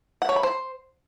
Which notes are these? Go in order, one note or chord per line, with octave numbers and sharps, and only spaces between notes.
F#5
C#5
B5
C5